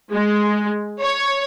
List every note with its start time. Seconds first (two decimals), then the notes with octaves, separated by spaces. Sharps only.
0.13 G#3
0.99 C#5